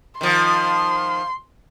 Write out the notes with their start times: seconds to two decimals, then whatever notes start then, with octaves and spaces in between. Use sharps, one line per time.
0.21 D#3 F3 C6